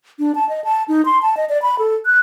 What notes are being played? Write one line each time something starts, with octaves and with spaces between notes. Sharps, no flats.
D4
A5
D#5
A5
D#4
C6
A5
D#5
D5
B5
A4
F#6